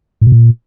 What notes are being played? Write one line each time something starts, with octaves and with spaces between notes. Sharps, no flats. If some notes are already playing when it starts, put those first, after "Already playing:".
A2
B2
A#2